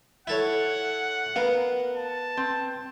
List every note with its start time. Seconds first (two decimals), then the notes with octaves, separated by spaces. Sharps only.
0.27 E4 A4 C#5 F#5
1.36 B3 A#4 F5
1.97 A5
2.37 C4